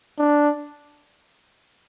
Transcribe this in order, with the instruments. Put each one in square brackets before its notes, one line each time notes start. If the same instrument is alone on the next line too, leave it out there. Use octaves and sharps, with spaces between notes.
[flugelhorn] D4